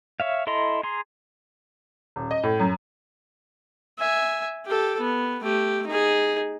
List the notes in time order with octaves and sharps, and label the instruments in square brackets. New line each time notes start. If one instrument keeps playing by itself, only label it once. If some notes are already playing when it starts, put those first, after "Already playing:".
[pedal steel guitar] C#5 E5 F5
E4 A4 D#5 A#5 C6
G#4 A#5 C6
[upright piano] D#1
D#5
A2
F#2
[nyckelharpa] E5 G#5
G4 A4
B3
A3 G4
D#4 G#4